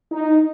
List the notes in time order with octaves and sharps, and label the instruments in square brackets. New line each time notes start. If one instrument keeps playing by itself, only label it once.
[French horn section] D#4